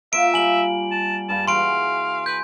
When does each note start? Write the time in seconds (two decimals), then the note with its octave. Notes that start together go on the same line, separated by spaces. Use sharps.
0.13 A#3 F4 E5 F#5 D7
0.34 G3 G4 G#5 F#7
0.91 A5
1.29 G2 G3 A5
1.48 E3 F#4 G#4 F5 C6 D7
2.26 B4 G6